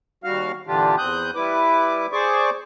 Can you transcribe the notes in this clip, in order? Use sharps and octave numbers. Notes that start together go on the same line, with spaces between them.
D#2 G3 F#4 F5 F6
A#2 D3 E3 D4 F4 G4
E2 C4 D#6 F#6 G6
G3 E4 B4 D6
G#4 C5 D5 C#6 D6